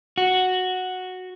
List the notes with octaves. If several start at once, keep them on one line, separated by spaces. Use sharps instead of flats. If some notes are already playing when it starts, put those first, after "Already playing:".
F#4